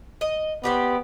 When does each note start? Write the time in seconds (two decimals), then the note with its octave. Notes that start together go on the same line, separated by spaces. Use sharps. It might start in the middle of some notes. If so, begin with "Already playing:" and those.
0.21 D#5
0.64 B3 C4 G4 D5